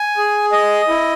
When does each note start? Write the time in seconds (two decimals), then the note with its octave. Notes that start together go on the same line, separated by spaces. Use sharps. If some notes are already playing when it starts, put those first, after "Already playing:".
Already playing: G#5
0.17 G#4
0.52 D#5
0.88 E4